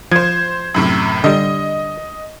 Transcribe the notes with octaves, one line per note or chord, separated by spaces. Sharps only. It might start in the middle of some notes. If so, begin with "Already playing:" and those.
F3 C5 G#6
F#2 A2 C3
D3 G3 D#5